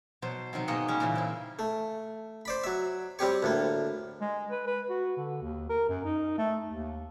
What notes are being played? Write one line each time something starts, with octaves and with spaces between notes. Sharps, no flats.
B2 F#3 C5
C3 D#3 F#3 C4
G#2 B2 G#3 A#3 D#5 F#5
G3 G#3 C#4
A#2 C#3 E3
C4 E4
A3
C5 D5 B5
F#3 E5
G3 C4 G4 C#5
D2 A2 A#3
G#3
B4
B4
F#4
D3
D#2
A#4
F#2
D#4
A3
D#2